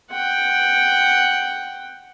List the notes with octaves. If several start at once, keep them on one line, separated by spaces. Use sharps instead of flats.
F#5 G5